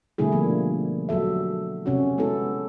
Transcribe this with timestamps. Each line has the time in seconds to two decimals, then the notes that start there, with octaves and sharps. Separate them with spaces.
0.18 B2 D3 G3 A3 E4 G#4
0.32 F3 A#3 D4
1.09 F#3 F#4 A4 E5
1.86 C3 C#4 F#4
2.18 G#3 B3 E4 F#4 A4